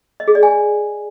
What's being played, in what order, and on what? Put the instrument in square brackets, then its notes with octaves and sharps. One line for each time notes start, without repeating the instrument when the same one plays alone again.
[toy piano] D#5
G#4
D5
G#5